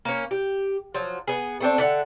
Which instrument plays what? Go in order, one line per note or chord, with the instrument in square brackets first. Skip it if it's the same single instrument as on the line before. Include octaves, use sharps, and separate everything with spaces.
[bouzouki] A#3 C#4
G4
F3 F#3
B3 G#4
A3 C4 D4
D3 E5 F#5